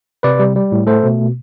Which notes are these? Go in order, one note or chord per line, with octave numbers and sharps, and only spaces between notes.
C3 B4 D5
G3
G3
A2
A3 A4 C5
B2